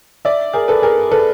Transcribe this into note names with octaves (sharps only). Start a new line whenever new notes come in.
D5 E5
G#4 A#4
A4 B4
G#4 A#4
A4 B4